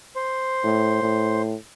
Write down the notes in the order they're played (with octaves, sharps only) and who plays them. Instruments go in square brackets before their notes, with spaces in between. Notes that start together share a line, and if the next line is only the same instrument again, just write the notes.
[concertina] C5
[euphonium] A2
A2